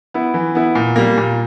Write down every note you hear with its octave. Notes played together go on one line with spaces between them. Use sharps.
B3 E4
E3
B3 E4
A#2
G3 A#3
A#2